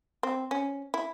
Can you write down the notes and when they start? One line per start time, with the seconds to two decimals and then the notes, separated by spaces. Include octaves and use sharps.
0.23 C4
0.51 C#4
0.94 E4